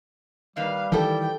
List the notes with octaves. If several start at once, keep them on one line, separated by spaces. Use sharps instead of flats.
D#3 G3 A#3 B4 F5
D#3 E3 G4 A4 G5